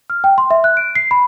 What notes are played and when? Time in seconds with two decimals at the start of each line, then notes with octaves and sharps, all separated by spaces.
0.10 F6
0.24 G5
0.38 C6
0.51 E5
0.64 F#6
0.77 D7
0.95 C7
1.11 B5